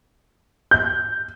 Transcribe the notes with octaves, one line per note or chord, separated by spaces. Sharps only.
G6